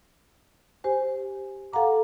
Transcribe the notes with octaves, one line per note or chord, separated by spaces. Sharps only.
G4 C5 G#5
A4 F5 F#5 A#5 D6